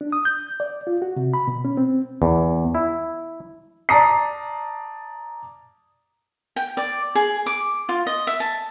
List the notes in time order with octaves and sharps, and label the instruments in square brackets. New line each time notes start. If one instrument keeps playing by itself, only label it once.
[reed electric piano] D4
D#6
G6
D5
F4
F#4
C3
B5
B2
C#4
C4
[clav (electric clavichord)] E2
E4
[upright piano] D5 A5 A#5 D#6 C7
[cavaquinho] G5
D5
G#4
D6
F4
D#5
E5
A5